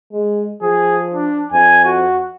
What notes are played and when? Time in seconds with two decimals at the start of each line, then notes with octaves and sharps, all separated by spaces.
0.12 G#3
0.62 F3 G#4
1.14 D4
1.52 F2 G#5
1.85 F#4